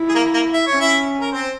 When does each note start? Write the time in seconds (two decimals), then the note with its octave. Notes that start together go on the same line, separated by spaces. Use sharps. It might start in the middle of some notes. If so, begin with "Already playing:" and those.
Already playing: E4
0.09 G#4
0.15 A#3 A#4
0.33 A#3 A#4
0.53 E5
0.67 C#5
0.73 C#4
0.80 E4 E5
1.21 A#4
1.32 C4 C5